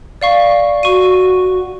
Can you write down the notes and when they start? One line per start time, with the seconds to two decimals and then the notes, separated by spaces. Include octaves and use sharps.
0.21 D5 F5 C#6
0.83 F#4 C#6 D#7